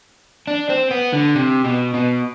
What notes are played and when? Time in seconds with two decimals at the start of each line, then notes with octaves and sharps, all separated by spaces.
0.47 D4
0.70 C4
0.91 B3
1.13 D3
1.35 C3
1.64 B2
1.94 B2